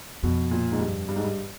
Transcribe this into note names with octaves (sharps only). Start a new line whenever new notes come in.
F2 B2
A#2
G#2
G2
G2
G#2
G2